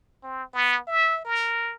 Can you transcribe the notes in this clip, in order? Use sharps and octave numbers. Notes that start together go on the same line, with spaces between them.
C4
B3
E5
A#4